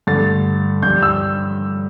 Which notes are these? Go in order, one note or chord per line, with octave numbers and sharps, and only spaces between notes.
G2 D3 A3 A6
G2 G3 G6
E6